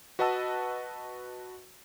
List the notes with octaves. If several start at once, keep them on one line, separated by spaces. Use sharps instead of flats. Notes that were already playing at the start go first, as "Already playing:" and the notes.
F#4 B4 D#5 F#5 A5 E6